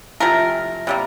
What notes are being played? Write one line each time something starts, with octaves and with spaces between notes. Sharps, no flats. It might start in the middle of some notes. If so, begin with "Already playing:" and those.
C3 F3 A3 A#4
C3 G3 A#3